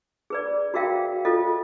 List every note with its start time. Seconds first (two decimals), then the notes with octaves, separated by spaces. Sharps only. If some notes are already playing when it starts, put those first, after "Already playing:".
0.30 G#4 B4 D5
0.74 F#4 G#4 A#4 E5 F5 G5
1.25 F4 A4 D#5